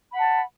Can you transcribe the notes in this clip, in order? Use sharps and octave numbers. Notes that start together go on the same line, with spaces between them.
F#5 A5 B5